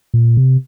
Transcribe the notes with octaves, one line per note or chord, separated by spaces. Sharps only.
A#2
C3